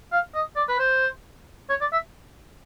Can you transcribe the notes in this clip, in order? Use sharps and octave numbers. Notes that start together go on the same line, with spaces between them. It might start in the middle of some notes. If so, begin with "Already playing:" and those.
F5
D#5
D5
B4
C5
C#5
D5
E5